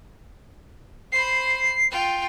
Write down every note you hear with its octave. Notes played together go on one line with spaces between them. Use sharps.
C5 B5 C7
F4 G5